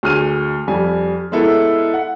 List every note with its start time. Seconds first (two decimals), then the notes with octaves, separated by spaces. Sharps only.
0.03 D2 G#4 F6 D#7
0.67 F2 G3 G#5
1.32 G#3 B3 E4 A4 A#4
1.94 F#5